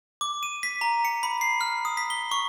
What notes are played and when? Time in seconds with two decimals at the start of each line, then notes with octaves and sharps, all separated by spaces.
0.21 D6
0.43 D#7
0.63 B6
0.81 A#5
1.05 C#7
1.23 B5
1.41 C7
1.61 F6
1.85 D#6
1.97 B6
2.10 G7
2.31 C#6